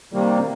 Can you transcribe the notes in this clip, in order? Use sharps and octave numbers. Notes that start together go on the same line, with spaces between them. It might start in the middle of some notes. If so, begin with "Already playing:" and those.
C3 D#3 G3 A#3